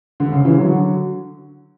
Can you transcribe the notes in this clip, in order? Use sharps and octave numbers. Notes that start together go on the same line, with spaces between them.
D3
C#3
C#3 E3
D3 F#3